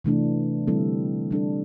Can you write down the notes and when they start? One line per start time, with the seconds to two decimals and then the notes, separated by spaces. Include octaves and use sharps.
0.04 C3 E3 A3 D4
0.67 D3 G3 C4 E4 A4
1.31 G3 D4 A4